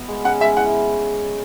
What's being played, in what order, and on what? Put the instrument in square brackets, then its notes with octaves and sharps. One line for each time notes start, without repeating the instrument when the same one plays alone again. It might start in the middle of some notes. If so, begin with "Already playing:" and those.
Already playing: [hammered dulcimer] B3 F#4
G#3
[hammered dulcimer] C#4 [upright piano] F#5
[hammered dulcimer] G#3 [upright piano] E5
[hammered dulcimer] E4 [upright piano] F#5